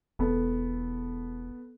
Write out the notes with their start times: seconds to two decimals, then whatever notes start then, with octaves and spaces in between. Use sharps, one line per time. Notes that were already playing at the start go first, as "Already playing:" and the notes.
0.19 E1 B3 A4